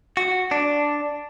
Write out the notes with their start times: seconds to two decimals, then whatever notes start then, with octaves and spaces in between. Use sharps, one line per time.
0.17 F#4
0.51 D4